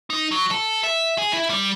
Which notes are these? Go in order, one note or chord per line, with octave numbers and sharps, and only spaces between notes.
D#4
F#3
A4
E5
G#4
E4
G3